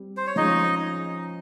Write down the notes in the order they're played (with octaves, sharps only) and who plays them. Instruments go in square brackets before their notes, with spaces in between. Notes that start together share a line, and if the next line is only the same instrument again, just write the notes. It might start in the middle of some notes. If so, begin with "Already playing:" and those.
Already playing: [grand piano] G3 C4
[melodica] C5
C#5
[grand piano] F3 G#3 C#4 [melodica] D#4 D#5